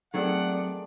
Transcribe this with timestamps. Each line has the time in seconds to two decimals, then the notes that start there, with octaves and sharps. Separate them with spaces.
0.14 D#3 F#3 A3 C4 G#4 A4 D5 F#5